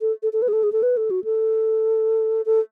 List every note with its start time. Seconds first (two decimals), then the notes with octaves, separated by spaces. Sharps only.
0.01 A4
0.23 A4
0.33 A4
0.42 B4
0.48 G#4
0.53 A4
0.63 G#4
0.72 A4
0.83 B4
0.97 A4
1.11 F#4
1.24 A4
2.46 A4